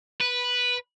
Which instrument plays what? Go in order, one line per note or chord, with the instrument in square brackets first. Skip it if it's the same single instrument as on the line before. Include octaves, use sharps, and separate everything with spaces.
[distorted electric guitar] B4